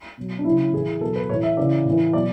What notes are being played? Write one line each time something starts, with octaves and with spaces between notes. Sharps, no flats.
B2 F#3
D4
C#3 F#3 E4
A2 E3 G#4
B2 F#3 A4
B4
A2 E3 C#5
E5
C#3 E3 D5
A2
E3
B2 F#3 D5